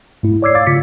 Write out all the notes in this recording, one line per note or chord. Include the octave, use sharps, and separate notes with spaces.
G#2 A3 E4
C#5 D5 D6 E6 G#6 C7
F5 D6 A6
C#3 F4 B6 C#7